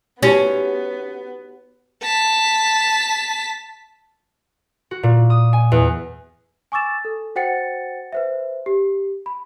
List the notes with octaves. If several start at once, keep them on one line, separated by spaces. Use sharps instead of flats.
B3 C#4 D#4 F#4 G4
A5 B6
F#4
A#2
D#6
G#5
E2
G#5 C#6 D6 E6 A6 E7
A4
F#4 C5 F#5 G5 A6 C#7
B4 C5 E5
G4
B5